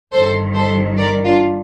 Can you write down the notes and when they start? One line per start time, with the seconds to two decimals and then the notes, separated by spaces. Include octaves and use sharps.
0.12 G1 G2 D#3 A4 C5
0.54 A4 C5
0.97 A#4 D5
1.24 D4 F4